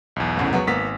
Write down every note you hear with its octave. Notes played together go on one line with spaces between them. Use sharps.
B1 E2
C2 F#2 A2
F#3 B3
G#1 A#3 B3 B6